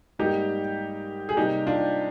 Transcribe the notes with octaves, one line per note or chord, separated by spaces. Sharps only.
G#2 G3 A#3 D#4 G4
G#4
C3 G3 A#3 D#4 G4
D4 F4